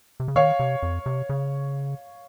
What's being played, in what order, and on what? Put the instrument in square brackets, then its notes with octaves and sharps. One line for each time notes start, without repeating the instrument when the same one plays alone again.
[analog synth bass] C3
C#3
[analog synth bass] D#3 [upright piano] C#5 F5
[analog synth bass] C3
F2
C3
C#3